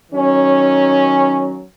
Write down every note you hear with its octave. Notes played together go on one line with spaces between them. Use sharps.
D#3 F#3 C#4